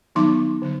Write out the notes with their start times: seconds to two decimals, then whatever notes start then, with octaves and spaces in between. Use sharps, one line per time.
0.15 D#3 F#3 B3 D#4 C6 D6
0.62 D3 F#3